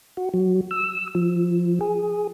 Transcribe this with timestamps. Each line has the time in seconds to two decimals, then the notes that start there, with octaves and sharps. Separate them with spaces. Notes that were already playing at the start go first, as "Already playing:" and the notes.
0.17 F#4
0.34 F#3
0.71 E6
1.15 F3
1.81 G#4